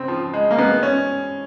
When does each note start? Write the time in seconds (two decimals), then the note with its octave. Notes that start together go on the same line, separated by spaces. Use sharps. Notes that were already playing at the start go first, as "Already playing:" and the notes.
Already playing: C#3 C4
0.08 F3
0.34 G#3
0.51 A#3
0.58 G#3 B3
0.83 C#4